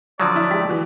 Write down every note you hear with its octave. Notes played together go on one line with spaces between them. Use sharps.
D3 F3 F#3 D5
E4 E5
G#3 G4 B6
E3 F#4